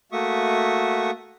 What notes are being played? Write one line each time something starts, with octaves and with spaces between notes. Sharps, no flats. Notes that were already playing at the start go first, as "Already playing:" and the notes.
A3 A#3 F#4 E5 C#6 D#6